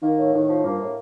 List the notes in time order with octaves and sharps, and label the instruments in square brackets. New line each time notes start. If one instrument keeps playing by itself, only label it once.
[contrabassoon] D#3 [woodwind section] A#3
[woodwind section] A2
[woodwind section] A2 [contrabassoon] D#3
[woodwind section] F3
[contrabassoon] G2 [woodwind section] A#3
[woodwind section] A2